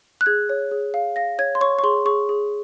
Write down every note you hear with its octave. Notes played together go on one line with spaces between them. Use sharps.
F#6
G#4 G#6
C#5
G#4
F5
F5 A#6
C#5 G#6
C6
C#5 C#6
C#6
G#4 C6
G#4 C#6
G#4